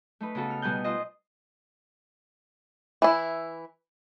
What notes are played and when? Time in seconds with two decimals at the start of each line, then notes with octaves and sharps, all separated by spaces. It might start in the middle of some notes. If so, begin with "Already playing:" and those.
0.20 A3 D#4 B4
0.35 C#3 B3 F#4 A4
0.50 F6
0.62 B2 G3 D#4 G#5 F#6 G6
0.84 F4 C5 D#5
3.02 E3 E4